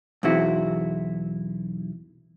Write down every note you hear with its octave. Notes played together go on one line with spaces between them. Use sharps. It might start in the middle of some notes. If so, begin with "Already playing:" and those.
B1 E2 C4 E4 F#4